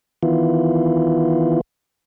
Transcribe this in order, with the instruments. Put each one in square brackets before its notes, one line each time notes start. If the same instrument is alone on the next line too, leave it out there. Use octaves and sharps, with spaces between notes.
[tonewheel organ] D#3 E3 B3 E4 F4